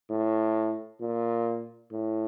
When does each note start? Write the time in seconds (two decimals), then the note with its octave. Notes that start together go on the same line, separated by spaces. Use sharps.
0.10 A2
1.01 A#2
1.92 A2